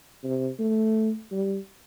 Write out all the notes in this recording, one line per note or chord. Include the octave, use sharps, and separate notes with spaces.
C3
A3
G3